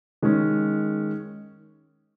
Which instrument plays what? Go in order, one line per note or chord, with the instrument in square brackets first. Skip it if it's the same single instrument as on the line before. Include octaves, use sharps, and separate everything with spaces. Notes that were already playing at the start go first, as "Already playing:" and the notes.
[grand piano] D#3 G#3 C#4